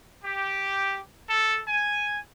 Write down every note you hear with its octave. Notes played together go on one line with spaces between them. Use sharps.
G4
A4
G#5